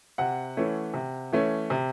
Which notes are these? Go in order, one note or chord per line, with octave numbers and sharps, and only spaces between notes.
C3 F#5
E3 A3 C#4
C3
E3 A3 C#4
C3